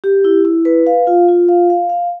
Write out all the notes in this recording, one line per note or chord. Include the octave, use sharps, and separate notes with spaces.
G4
E4
E4
B4
F5
F4
F4
F5
F5
F5